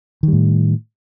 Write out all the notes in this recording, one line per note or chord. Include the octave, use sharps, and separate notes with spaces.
A2 D#3 G3